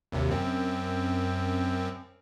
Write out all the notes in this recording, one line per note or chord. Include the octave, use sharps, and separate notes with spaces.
G#1 D#2 C3
F#2 C4